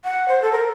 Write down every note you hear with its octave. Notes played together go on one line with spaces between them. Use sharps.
F#5
C5
A4
A#4